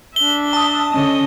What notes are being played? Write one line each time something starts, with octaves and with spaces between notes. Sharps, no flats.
D4 E5 G7
A5 D#6
D3 C#4 D#5